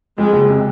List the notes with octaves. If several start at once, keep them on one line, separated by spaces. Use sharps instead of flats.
F2 G#3
F#1
C3